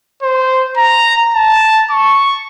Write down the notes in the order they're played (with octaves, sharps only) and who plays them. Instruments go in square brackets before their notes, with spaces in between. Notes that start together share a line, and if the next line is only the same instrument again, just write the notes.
[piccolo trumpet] C5
A#5
A5
C#6